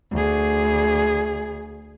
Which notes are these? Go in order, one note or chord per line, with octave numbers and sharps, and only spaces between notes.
D2 G#4